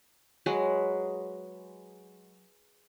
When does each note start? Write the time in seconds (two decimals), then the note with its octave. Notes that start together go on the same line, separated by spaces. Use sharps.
0.46 F#3 G#3 B4